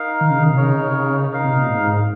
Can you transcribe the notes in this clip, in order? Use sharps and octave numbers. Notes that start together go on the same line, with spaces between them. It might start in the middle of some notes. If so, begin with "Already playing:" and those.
Already playing: D#4 A#4 F5
D#3
C#3
D#3
C3
C#3 D#4 A#4 C#5
C3
C#3
D#4 A#4 F5
C3
A#2
G#2